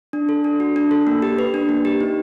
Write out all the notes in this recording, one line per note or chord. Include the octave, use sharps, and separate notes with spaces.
D4
A4
D4
F#4
D4
A4
A#3
G4
B4
D4
A#3
G4
D#4